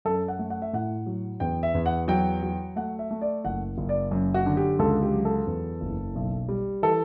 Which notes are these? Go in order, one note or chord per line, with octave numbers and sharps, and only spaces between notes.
F#2 A4
F#5
A3
F#5
E5
A2 F#5
F#3
E2 G5
E5
E2
F#5
F#3 G5
F#3
A3 F#5
E5
A3
D5
F#1 F#5
F#1
D5
F#2
F#4
D3
G4
C#2 A4
G4
F#3
A4
E2
F#1
B1
G3
E3 A4